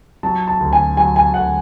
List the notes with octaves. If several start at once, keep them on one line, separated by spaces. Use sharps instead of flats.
F#3 A5
A5
D2
G#5
F#3 G#5
G#5
D2 F#5